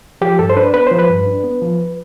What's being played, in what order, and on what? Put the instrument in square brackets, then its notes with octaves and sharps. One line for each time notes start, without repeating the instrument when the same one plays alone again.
[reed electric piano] F3 G4
G2 A4
C5
D4 B4
B3 B4
F3 C5
B4
G2
D4
B3
F3